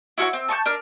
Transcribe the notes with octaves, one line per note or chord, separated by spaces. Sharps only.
E4 F#4 A4 C#5
C4
A5 C#6 D6 G6
D4 A#4